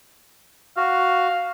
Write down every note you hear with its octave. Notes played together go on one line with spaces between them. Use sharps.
F#4 F5